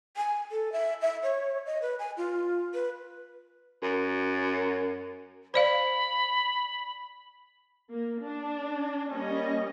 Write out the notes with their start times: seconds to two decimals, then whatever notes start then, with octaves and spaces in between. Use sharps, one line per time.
0.17 G#5
0.51 A4
0.72 E5
1.01 E5
1.23 C#5
1.66 D#5
1.82 B4
1.99 G#5
2.17 F4
2.74 B4
3.82 F#2
5.54 C5 D5 F5 B5
7.93 A#3
8.25 D4
9.14 G3 A#3 C#4 D#5